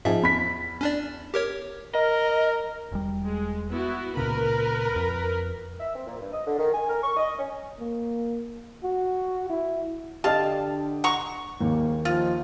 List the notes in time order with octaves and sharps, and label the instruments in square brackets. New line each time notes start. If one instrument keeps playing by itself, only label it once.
[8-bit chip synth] G#2 E5 [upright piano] F3 D#4 G#4
[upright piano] E2 B5 B6
[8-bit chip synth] C#4 D4 D5
G4 A#4 C#5
[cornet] A#4 [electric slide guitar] D#5
[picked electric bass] E1 G3
[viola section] G#3
B3 E4 F#4
[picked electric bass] C#2 A#2 C#3 [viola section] A#4 B4 B5
[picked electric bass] F2
[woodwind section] E5
C4
A#2
G2
D#5
D3
D#3
G#5
A#4
C#6
D#5
C#4
[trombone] A#3
F#4
E4
[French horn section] D3 D4 [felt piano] G4 D#5 [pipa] F5 A5
[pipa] F#5 A#5 C#6
[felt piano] D#2 [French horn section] G#2 A#3
[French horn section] D#3 F3 [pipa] F4